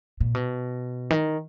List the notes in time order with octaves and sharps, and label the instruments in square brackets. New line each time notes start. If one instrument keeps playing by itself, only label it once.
[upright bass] A#2
B2
D#3